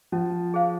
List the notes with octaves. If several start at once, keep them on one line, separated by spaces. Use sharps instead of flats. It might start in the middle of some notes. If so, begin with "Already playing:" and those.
F3 C#4
G#4 C5 F5